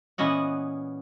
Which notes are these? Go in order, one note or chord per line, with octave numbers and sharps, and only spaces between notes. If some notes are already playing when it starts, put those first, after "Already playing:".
A#2 E3 B3 C#4 D#5 F#5